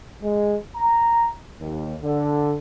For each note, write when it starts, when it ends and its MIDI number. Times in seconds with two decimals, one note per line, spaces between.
0.23 0.55 56
0.76 1.30 82
1.61 1.95 39
2.03 2.56 50